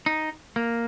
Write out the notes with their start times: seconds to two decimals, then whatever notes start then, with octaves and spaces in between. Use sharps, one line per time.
0.06 D#4
0.56 A#3